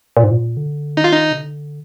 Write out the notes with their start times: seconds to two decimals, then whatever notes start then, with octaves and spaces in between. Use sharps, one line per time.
0.17 A#2
0.24 G#2
0.31 A#2
0.57 D3
0.97 D#3 D#4
1.04 F4
1.12 D#4
1.31 C3
1.38 D3